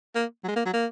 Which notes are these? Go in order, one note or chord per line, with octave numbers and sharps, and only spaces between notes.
A#3
F#3
G#3
A#3
F#3
A#3